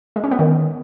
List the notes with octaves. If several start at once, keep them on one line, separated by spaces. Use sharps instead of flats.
G#3
C#4
B3
D#3